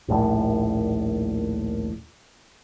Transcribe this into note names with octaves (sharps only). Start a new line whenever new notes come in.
D#1 A#1 A2